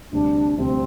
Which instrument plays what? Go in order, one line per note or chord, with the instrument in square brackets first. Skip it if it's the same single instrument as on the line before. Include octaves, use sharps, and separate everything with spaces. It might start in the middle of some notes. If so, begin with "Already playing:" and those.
[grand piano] D2 C3 G3 [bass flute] D4
[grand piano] D2 C3 G3 [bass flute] C4